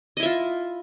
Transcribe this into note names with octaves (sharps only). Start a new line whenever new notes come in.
E4 F4 D#5 E5